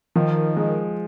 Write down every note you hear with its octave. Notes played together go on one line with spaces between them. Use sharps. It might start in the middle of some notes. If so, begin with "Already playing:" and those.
D#3 F3
G#3